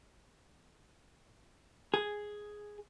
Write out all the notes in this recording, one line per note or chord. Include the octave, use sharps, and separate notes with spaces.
G#4